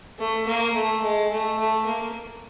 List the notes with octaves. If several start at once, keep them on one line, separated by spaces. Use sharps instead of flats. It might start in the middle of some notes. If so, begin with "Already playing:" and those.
A3
A#3
A3
G#3
A3
A3
A#3